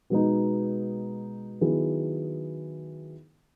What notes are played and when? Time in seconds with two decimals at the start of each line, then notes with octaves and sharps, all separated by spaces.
0.10 B2 G#3 B3 D#4
1.61 D#3 F#3 B3 E4 G#4